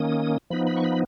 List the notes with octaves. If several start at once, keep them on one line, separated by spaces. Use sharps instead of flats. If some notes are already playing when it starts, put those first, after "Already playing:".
Already playing: D#3 A#3 C#4 D#6
F3 B3 D#4 B5
B5
C#6
B5